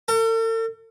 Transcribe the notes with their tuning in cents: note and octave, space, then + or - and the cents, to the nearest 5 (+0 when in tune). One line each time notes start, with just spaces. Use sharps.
A4 +45